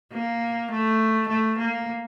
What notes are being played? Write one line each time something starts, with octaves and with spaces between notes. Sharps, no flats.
A#3
A3
A3
A#3